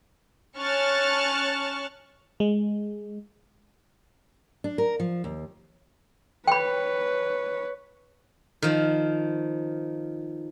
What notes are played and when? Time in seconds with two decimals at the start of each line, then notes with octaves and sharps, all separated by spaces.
0.59 C#4 A5 C#6 F6 F#6 A6
2.40 G#3
4.64 D4
4.78 A#4
5.00 F3
5.24 D#2
6.48 B4 C#5 G5 B5
8.62 D#3 F3